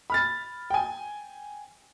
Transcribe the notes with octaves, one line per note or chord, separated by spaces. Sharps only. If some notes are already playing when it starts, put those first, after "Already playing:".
B5 F6 A6
G5 G#5